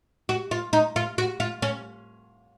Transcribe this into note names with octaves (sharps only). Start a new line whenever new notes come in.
F#4
F4
D#4
F4
F#4
F4
C#4